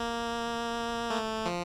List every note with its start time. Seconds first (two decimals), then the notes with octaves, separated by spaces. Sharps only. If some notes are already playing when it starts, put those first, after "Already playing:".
Already playing: A#3
1.10 A3
1.46 F3